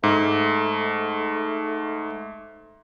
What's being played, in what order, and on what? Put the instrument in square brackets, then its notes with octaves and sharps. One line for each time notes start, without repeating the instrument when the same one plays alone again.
[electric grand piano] G#2 [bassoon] A3